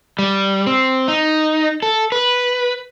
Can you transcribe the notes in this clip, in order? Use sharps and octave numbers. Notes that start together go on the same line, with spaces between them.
G3
C4
D#4
A4
B4